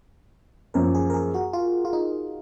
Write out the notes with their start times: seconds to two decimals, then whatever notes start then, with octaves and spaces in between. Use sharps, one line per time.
0.74 F#2 F3 A#3 A#4
0.95 G#4
1.10 A#4
1.14 G#4
1.34 F#4
1.53 F4
1.85 F4
1.93 D#4